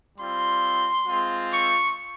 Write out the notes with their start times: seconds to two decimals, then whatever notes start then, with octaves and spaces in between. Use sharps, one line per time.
0.18 G3 C4 F4 C6
1.06 G#3 C4 F4
1.51 C#6